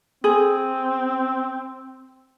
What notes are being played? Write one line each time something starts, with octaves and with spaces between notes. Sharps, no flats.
C4 G#4